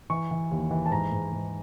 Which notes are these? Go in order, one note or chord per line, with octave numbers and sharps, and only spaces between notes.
E3 C#6
E3
D#2
E3
A5
G#2 A#5
G#2
G#2